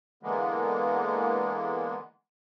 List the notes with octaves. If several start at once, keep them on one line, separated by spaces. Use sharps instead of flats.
D3 E3 G#3 A#3 B3